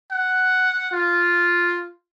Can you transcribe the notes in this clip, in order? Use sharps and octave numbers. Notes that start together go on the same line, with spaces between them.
F#5
F4